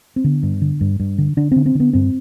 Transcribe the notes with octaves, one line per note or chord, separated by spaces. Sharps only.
C4
D3 B3
G2
D3
G2
G2
D3
D3 D4
D3 C4
C4
D3 B3
G2 C4